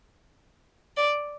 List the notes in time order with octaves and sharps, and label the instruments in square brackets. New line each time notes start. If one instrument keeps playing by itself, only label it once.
[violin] D5